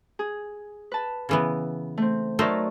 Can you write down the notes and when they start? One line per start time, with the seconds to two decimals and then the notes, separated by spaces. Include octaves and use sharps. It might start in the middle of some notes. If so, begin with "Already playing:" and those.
0.19 G#4
0.92 B4 A5
1.29 C#3 E3 B3
1.97 A3 C4
2.39 F#3 A3 D#4 A#4 C5 D5